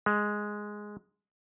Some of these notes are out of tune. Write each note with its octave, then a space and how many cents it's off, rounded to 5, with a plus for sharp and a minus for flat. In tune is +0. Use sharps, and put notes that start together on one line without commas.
G#3 +0